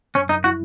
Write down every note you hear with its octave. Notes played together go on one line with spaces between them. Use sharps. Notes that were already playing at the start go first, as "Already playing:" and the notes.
F#2 C#4
F#2 D#4
E4 F#4